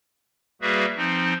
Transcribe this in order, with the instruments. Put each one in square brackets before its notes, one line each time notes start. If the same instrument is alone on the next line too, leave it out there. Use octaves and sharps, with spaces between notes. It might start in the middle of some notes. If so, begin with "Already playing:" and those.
[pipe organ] G3 A#3 F#4 G#4 B4 E5
F3 C4 D#4